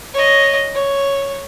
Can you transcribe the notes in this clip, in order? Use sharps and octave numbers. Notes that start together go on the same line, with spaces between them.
C#5 D#5
C#5